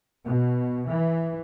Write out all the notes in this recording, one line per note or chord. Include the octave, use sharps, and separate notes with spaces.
B2
E3